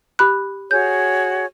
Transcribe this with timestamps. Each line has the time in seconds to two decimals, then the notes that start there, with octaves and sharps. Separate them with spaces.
0.19 G4 B5 F#6
0.71 F#4 G#4 C#5 G6